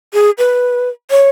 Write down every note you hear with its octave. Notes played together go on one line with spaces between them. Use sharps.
G#4
B4
C#5